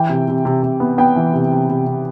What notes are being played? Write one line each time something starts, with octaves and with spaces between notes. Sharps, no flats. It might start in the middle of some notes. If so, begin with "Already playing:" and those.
Already playing: E3 G5
C3
C3
C3
C3
B3
B3 G5
E3
C3
C3
C3
C3